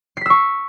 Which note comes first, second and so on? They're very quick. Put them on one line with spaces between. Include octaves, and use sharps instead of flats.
C7 B6 E6 C#6